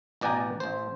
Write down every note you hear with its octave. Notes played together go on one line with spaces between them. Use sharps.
A1 B2 D5 G5 G#5 A#5
A1 C5